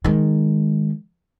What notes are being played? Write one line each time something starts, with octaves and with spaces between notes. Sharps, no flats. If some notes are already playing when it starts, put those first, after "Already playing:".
D#3 G#3